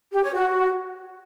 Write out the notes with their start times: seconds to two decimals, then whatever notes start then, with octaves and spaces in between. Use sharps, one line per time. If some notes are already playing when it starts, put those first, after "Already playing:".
0.12 G4
0.23 C#5
0.34 F#4